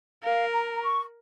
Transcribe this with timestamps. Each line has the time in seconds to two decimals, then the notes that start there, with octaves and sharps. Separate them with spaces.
0.23 A#4 F5
0.52 A#5
0.70 A#5
0.81 C#6